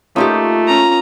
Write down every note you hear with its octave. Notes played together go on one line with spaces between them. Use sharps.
A3 A#3 C#4 D#4 F4 G4 D#6
C#4 A#5